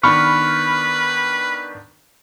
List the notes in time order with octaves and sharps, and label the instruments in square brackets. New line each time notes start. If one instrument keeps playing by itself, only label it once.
[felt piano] D#3 B3 D4 [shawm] B4 [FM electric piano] B5 F6 [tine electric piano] C#6